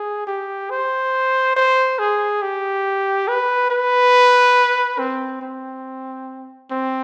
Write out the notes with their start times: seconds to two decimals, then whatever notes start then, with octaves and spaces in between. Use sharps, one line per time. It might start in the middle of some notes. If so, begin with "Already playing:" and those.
Already playing: G#4
0.27 G4
0.70 C5
1.56 C5
1.99 G#4
2.42 G4
3.28 B4
3.70 B4
4.99 C4
5.41 C4
6.71 C4